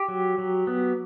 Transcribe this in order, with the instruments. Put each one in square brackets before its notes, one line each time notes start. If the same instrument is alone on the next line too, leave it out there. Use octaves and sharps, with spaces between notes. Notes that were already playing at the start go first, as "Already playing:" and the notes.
Already playing: [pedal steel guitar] G4
F#3
F#3
B3